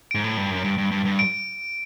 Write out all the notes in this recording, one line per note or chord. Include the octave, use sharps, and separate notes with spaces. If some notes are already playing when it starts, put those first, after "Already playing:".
G#2 D7
A2
G2
F#2
G2
G2
G2
G2
D7